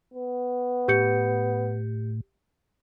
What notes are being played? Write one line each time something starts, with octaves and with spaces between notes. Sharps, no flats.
B3
A2 G4 G6 C#7